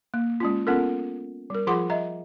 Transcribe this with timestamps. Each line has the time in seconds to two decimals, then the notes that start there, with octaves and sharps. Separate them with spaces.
0.14 A#3
0.40 G#3 C#4 F4
0.67 B3 C#4 F4 A4 A#4
1.50 G3 A#4
1.67 F3 F4 G#4 F#5 C6 D6
1.90 D#5 E5 A#5